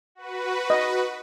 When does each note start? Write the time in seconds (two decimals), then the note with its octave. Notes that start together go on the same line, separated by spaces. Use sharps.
0.15 F#4 B4
0.70 D#5